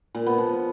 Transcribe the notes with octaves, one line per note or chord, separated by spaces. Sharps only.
A#2
B3
F3